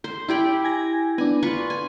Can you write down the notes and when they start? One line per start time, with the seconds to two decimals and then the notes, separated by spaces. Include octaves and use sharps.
0.04 C5
0.28 E4 G4 G5
0.64 G#5 G#6 A#6
1.18 B3 D4 G#5
1.43 F4 B4 C#6
1.70 G#5